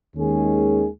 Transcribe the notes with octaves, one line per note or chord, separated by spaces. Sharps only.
D#2 D#3 G#3 C#4 G#4